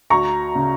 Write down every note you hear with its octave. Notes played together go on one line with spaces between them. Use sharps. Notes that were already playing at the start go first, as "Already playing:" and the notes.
D2 A#5 C#6
C#3